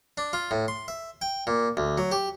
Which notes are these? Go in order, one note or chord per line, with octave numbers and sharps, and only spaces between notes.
D4
F4
A2
C6
E5
G5
A#2
D2
F#3
G4